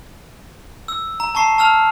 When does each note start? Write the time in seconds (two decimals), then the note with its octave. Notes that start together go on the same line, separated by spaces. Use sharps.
0.88 E6
1.20 A#5
1.35 A5 A#5 C#6 C7
1.58 A5 E6 F6 F7